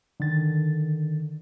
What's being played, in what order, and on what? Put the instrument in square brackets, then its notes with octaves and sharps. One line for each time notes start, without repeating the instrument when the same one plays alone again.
[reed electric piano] D3 D#3 A6